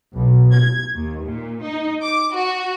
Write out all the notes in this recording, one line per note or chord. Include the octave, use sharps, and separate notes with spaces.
B1
G#6
D#2
A#2
D#4
D6
F#4